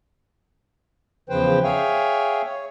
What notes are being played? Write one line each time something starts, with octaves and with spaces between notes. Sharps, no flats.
E2 C#3 F3 B4 C5 G5
G#4 C#5 E5 F5 G5 G#5
C#5